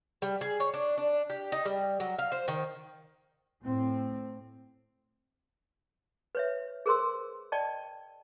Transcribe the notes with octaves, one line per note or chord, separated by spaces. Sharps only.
G3
G#4
C#5
D4
D4
G4
D#4
G3
F#3
F5
C5
D#3
A2 C4
B4 C#5 E5
G#4 A#4 C5 C6 E6
D5 D#5 G5 A5